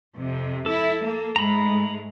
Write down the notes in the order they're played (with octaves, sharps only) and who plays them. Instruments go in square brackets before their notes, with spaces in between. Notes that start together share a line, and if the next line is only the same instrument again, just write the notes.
[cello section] F2 C3
[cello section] E4 [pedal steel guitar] A4
[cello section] A#3
[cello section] G#2 G#3 A3 [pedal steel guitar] A#5 B5